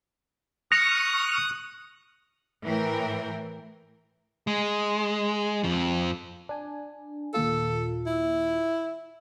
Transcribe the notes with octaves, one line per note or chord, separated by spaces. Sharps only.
C#6 D#6 F6 F#6 A#6
A2 E3 A#4 G5
G#3
F2 F3
D4 G#5
D#2 A#2 F4 A4
E4